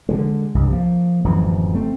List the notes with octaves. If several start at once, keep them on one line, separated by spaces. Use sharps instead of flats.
D3 E3 G#3
C2 G2
F3 A#3
D1 F#2 E3 F3
A3 C4